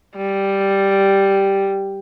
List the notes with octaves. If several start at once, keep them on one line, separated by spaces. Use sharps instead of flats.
G3